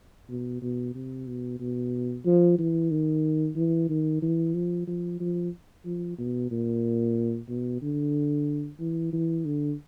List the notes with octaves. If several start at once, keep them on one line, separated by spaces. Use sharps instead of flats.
B2
B2
C3
B2
B2
F3
E3
D#3
E3
D#3
E3
F3
F3
F3
F3
B2
A#2
B2
D3
E3
E3
D3